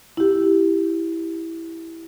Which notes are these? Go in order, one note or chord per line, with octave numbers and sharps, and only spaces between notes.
E4 G4